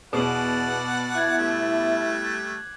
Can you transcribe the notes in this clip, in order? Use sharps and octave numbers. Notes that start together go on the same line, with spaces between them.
E2 B2 D5 F#5 B5 D6 C7 F#7
E4 F#6 G#6
G3 A3